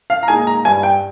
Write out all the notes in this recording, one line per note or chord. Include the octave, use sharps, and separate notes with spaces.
F5
A#5
A#2 G#3 D#4 G#5
A#5
G2 G#5
G5